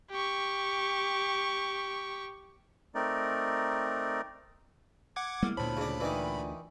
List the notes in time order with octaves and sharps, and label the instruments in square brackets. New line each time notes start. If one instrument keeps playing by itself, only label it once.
[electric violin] G4 C#6
[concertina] A3 C4 D#4 A#4 D5
[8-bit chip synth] F#5 D6 G#6
[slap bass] G3 G#3 A#3 [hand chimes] B3 E4 F6
[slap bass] D2 [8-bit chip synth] A#2 B5 [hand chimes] C5 C#5 A5
[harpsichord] C#3 D4
[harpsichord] D#3 E3 [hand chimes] F4 D5 G#5